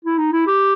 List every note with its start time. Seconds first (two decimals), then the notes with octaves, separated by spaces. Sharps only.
0.05 E4
0.18 D#4
0.32 E4
0.47 G4